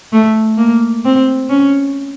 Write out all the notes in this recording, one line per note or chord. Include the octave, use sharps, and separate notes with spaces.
A3
A#3
C4
C#4